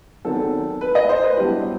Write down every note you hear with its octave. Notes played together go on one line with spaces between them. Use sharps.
E2 D#3 F#3 C4 A4
B4
D#5
C5
B4
G2 F#3 B3 E4 G4